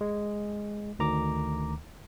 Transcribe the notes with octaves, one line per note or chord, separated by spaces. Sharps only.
G#3
D2 D#3 A#5 D6